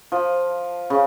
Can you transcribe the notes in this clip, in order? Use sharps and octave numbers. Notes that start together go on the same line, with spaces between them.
F3
C#3